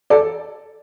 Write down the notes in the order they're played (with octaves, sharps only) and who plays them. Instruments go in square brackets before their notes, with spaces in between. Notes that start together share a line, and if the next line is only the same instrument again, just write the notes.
[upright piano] A4 D5